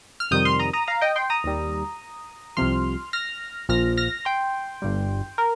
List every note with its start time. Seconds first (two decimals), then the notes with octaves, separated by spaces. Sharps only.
0.20 F6
0.31 F2 C3 D#3 G3 D#6 G6
0.45 C6 F6
0.59 A#5 D#6
0.73 A#5 D#6
0.88 F5 A#5
1.01 D#5 G5
1.16 G5 C6
1.30 A#5 D#6
1.44 D#2 D#3 G3
2.57 C2 C3 F3 C6 F6
3.13 F6 A#6
3.69 A#1 A#2 F3 F6 A#6
3.97 F6 A#6
4.25 G5 C6
4.82 G1 G2 G3
5.38 A#4